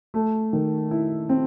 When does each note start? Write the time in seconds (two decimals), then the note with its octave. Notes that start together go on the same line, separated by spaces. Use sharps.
0.14 A3
0.53 D#3
0.91 E4
1.29 C4